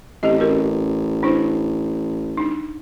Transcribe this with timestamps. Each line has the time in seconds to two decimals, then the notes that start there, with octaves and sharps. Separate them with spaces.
0.23 A1 C4 G4 D#5
0.39 C#4 F#4 A#4
1.23 D4 E4 C5
2.37 D4 D#4